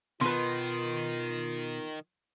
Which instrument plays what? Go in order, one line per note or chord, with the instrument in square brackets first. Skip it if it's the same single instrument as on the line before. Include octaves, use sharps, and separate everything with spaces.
[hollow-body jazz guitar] B2 B4 [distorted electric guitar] D#3 [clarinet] F4 [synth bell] C6